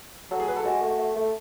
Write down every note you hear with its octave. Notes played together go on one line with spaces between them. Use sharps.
F#3 A4
G#4
F#3 B4
A4
G#3 F#4
A3
A3
A3